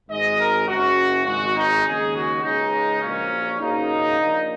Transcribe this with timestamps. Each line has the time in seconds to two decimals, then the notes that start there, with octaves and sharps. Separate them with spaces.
0.08 G#1 G#2 G#3 D#5
0.38 A#4
0.67 F#1 F#2 C#3 F#4
1.25 G#1 G#2 G#3 F#4
1.55 D#4
1.84 D#2 C#3 G#3 G#4
2.13 F#4
2.42 C#2 C#3 G#3 D#4
3.01 A#1 A#2 F#3 A#3 C#4
3.59 F#1 F#2 C#3 A#3 D#4
4.18 A#1 A#2 A#3